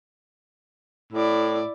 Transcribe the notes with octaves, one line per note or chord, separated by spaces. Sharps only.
A2 E4 D5